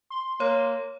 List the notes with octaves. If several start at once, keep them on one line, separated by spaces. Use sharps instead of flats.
C6
A#3 C#5